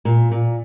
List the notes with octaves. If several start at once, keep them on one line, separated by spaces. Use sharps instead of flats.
A#2
A#2